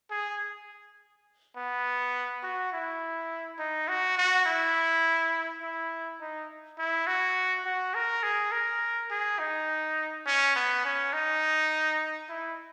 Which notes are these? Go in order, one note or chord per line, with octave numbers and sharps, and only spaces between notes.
G#4
B3
F#4
E4
D#4
F#4
F#4
E4
E4
D#4
E4
F#4
F#4
A#4
G#4
A#4
G#4
D#4
C#4
B3
C#4
D#4
E4